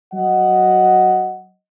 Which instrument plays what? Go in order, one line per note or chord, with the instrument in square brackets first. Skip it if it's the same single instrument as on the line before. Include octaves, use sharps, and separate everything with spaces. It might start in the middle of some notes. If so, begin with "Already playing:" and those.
[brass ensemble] F#3 D#5 F#5